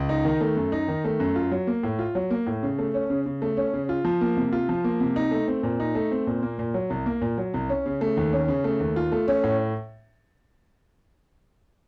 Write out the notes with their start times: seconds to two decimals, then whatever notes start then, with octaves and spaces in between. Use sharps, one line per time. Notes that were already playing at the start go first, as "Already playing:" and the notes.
Already playing: C#2
0.09 D#4
0.25 D#3
0.41 A3
0.57 F#2
0.72 D#4
0.88 D#3
1.05 A3
1.20 F#2
1.36 F4
1.52 F#3
1.67 A#3
1.83 A2
1.99 F4
2.15 F#3
2.30 A#3
2.47 A2
2.63 C#3
2.79 A3
2.94 C#4
3.10 C#3
3.26 C#3
3.42 A3
3.57 C#4
3.74 C#3
3.89 F4
4.05 F3
4.21 A#3
4.37 C3
4.53 F4
4.69 F3
4.84 A#3
5.00 C3
5.16 D#4
5.31 A3
5.48 C4
5.63 A#2
5.80 D#4
5.95 A3
6.11 C4
6.27 A#2
6.43 A#3
6.59 A#2
6.74 F#3
6.90 C2
7.06 A#3
7.21 A#2
7.38 F#3
7.54 C2
7.69 C#4
7.86 C#3
8.01 A3
8.17 D#2
8.33 C#4
8.48 C#3
8.64 A3
8.80 D#2
8.96 F4
9.12 A3
9.28 C#4
9.44 A2